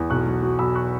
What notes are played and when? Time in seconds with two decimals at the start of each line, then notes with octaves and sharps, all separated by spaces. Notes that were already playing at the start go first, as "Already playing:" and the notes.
Already playing: E2
0.10 B1 C#6 F#6
0.26 F#3
0.43 F#3
0.59 B1 B5 E6
0.75 C#6 F#6